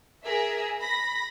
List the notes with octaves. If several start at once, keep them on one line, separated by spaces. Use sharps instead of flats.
G#4 A#4 E5
B5 A#6